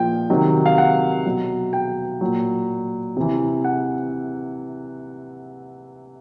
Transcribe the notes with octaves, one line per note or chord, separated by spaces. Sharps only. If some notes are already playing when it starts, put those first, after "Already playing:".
Already playing: A#2 F3 G5
C3 D#3 F#3
F5
F#5
B2 F#3
G5
A#2 F#3
C3 E3
F#5